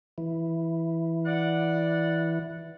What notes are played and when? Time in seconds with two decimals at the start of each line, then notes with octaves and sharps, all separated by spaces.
0.18 E3
1.26 D5 F#5